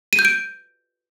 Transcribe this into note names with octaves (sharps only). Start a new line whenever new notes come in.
D#7
G6
D7